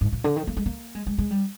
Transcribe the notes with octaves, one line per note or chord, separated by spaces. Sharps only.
G#2
A#2
D3
D#3
A#3
G#3
A#3
G#3
G#3
G#3
G3